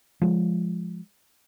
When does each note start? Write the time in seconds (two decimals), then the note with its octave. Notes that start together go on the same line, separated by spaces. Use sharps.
0.22 F3 G#3